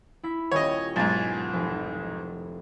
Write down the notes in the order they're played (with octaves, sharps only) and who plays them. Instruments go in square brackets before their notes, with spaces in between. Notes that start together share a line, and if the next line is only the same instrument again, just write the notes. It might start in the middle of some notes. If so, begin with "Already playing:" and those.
[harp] E4 B6
[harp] D#1 G4 [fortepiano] C#5 D#5
[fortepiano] B1 G#2 [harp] G#5 A6 D#7
[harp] F1